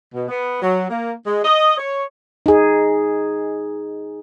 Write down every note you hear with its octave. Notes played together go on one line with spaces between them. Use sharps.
B2
B3
F#3
A#3
G#3
D#5
C#5
D#4 G#4